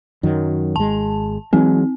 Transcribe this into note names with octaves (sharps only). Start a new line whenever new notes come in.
F#2 D#3 F#3
G#1 G#3 A5
E3 F#3 G#3 C4